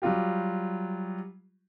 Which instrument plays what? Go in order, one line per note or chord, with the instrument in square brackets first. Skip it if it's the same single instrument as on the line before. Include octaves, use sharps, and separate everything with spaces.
[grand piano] F#3 G3 F4 G4